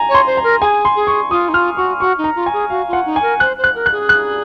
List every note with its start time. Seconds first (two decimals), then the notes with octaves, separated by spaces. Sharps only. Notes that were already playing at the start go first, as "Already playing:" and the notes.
Already playing: G#5 A#5
0.09 C#5
0.14 C6
0.27 C5
0.37 A#5
0.44 A#4
0.61 G#4 G#5
0.85 C6
0.96 G#4
1.07 C#6
1.30 F4 D#6
1.49 D#4
1.54 F4 F6
1.77 F#4 C#6
2.00 F#4 C#6
2.18 D#4
2.24 A#5
2.36 F4
2.46 G#5
2.53 G#4
2.70 F#4 F5
2.88 F4 F#5
3.06 D#4
3.16 G#5
3.22 A#4
3.40 C5 F#6
3.58 C5
3.64 F#6
3.75 A#4
3.86 F#6
3.92 G#4
4.09 F#6